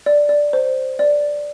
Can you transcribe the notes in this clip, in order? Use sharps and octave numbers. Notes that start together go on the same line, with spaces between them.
D5
D5
C5
D5